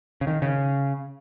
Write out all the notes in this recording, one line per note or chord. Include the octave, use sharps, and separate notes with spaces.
C#3
D#3
C#3